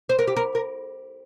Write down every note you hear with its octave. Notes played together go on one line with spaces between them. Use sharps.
C5
A#4
G4
A#4
A#4